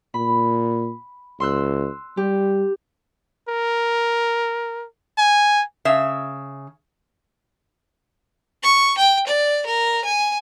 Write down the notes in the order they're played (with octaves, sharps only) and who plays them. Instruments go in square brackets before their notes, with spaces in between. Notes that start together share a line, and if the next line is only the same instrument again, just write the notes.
[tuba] A#2 [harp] B5
[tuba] C#2 [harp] C6 E6 F#6
[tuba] G3 [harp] G4
[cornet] A#4
G#5
[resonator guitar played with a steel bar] C#3 E5
[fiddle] C#6
G5
D5
A#4
G#5